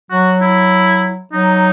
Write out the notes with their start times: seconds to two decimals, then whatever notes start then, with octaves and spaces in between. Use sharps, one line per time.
0.11 F#3 F#4
0.41 E4
1.32 F#3 D#4